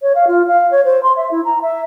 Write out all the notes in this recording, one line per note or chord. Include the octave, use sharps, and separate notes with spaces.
C#5
F5
F4
F5
C#5
C5
C6
E5
E4
A#5
E5